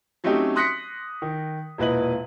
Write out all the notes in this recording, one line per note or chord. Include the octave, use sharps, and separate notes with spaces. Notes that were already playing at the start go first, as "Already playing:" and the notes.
F#3 A3 C4 C#4 D#4 G4
C6 D#6 F#6 A#6 B6 C#7
D#3
E1 A#2 E4 B4 D#5 F#7